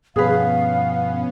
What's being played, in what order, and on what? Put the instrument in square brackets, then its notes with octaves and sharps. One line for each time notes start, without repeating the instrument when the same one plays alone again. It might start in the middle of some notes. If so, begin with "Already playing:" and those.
[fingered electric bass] G2 B2 F3 [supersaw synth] B3 C#4 [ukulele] G#4 B4 [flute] F5